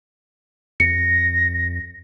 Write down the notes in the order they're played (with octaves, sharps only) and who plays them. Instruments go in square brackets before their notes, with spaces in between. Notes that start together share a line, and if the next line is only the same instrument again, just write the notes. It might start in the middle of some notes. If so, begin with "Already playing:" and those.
[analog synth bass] F2 [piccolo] A#6 [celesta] C#7